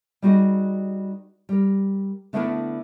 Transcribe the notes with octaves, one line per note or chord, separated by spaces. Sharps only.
G3 D#4 F#4 G#4 B4 D#5
G3 A#4
D3 A3 B3 D4 E4 A#4